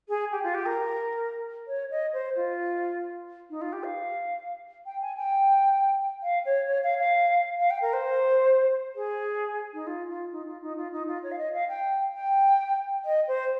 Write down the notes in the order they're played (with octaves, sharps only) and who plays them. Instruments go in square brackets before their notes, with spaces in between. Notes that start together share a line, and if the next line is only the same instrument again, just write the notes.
[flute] G#4
G4
F4
G4
A#4
C#5
D#5
C5
F4
D#4
F4
G4
F5
G5
G#5
G5
F5
C#5
C#5
F5
F5
F5
G5
A#4
C5
G#4
D#4
F4
F4
D#4
F4
D#4
F4
D#4
F4
C#5
F5
D#5
F5
G5
G5
D#5
C5